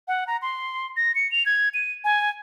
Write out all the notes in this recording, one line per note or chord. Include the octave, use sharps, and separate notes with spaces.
F#5
A#5
C6
A#6
C#7
F7
G#6
D#7
G#5